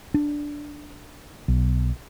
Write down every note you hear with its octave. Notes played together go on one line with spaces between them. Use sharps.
D4
B1